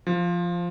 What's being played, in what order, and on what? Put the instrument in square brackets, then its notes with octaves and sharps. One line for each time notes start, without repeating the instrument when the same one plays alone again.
[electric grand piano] F3